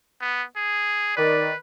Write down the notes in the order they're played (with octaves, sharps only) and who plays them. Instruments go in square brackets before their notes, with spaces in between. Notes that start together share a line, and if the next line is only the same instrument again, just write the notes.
[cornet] B3
G#4
[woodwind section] D#3 D5 [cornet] B4